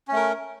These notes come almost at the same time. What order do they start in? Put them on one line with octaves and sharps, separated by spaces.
C#4 A3 A#4